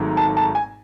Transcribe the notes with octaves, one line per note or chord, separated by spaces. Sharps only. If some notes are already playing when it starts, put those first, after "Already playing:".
Already playing: G#1 G#2 F#3 A3
A5
A5
G#5